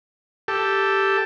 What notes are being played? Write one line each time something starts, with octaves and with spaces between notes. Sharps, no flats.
G4 A4